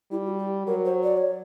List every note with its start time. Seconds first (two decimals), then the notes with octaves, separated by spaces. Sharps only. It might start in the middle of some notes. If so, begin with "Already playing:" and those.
0.11 G3 E4
0.26 F#4
0.39 G4
0.67 F#3 A#4
0.85 C5
1.03 D5
1.18 C#5